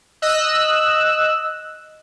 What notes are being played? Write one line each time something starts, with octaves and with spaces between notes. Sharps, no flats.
D#5 E6 F#6